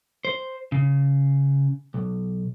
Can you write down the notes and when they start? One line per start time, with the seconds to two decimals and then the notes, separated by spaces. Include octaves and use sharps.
0.25 C5
0.72 C#3
1.94 B1